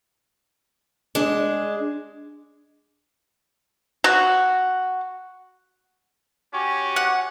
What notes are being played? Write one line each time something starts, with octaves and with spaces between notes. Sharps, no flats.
G#3 D4
F#4
C#4 F#4 G4 D6
F#5